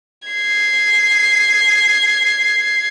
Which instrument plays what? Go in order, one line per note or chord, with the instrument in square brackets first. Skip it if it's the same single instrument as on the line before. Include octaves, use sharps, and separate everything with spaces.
[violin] G#6 C7